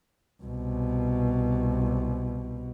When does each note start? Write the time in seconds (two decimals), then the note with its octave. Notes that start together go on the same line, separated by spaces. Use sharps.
0.43 C2 B2